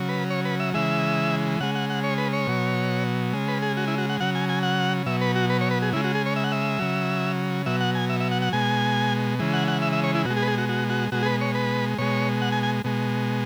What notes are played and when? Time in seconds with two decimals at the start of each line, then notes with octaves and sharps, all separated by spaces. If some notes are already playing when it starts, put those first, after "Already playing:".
Already playing: C#3 F#3
0.09 B4
0.30 C#5
0.45 B4
0.60 E5
0.74 C#3 E3 G#3 E5
1.60 C#3 G#3 F#5
1.75 F#5
1.90 F#5
2.04 C#5
2.18 B4
2.33 C#5
2.47 B2 F#3
3.33 C#3 G#3
3.48 B4
3.62 G#4
3.77 F#4
3.88 E4
3.98 F#4
4.10 F#5
4.20 C#3 F#3 F#5
4.35 G#5
4.49 G#5
4.63 F#5
5.06 B2 F#3 E5
5.21 B4
5.36 F#4
5.50 B4
5.61 C#5
5.71 B4
5.82 G#4
5.93 C#3 E4
5.96 G#3
6.04 F#4
6.15 G#4
6.26 C#5
6.36 E5
6.44 F#5
6.52 E5
6.79 C#3 F#3
7.66 B2 F#3 E5
7.81 F#5
7.95 G#5
8.09 E5
8.20 E5
8.31 F#5
8.42 F#5
8.53 B2 G#3 G#5
9.39 C#3 E3 G#3
9.54 F#5
9.68 F#5
9.82 E5
9.93 E5
10.04 C#5
10.15 E4
10.25 B2 F#4
10.30 G#3
10.37 G#4
10.43 B4
10.47 G#4
10.58 F#4
10.69 F#4
10.90 F#4
11.12 B2 G#3 F#4
11.23 G#4
11.26 B4
11.41 C#5
11.55 B4
11.98 B2 G#3 C#5
12.42 F#5
12.52 G#5
12.63 G#5
12.84 B2 G#3